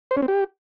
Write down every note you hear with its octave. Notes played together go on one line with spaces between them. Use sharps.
C5
C#4
C4
G4